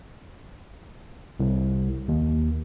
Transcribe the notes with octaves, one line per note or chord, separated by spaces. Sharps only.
C2
D#2